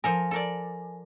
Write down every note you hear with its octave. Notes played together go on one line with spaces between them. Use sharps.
F3 A4 A#4 G#5
A4 A#4 D5